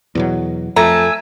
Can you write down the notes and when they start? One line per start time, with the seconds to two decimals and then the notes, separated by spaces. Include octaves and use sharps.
0.15 E2 B2 F#3
0.76 F2 A3 G#5 A#5 E6